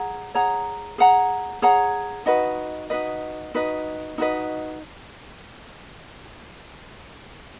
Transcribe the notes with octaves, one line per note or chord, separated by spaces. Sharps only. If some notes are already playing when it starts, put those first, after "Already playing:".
Already playing: G#4 C#5 F#5 A#5
G#4 C#5 F#5 A#5
G#4 C#5 F#5 A#5
G#4 C#5 F#5 A#5
D#4 F#4 B4 D#5
D#4 F#4 B4 D#5
D#4 F#4 B4 D#5
D#4 F#4 B4 D#5